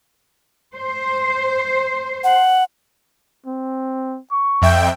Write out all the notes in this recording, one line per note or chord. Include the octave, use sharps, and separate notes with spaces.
C5
F#5
C4
C#6
F2 E5 G5